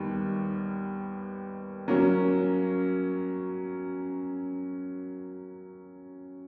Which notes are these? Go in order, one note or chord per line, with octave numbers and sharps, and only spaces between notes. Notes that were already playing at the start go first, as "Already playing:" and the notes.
Already playing: D#2 D#3 G3 B3
F#3 A#3 C#4